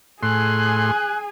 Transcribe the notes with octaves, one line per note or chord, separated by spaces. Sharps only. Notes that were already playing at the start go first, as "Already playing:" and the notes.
A2 G#4 G#5 C6 F#6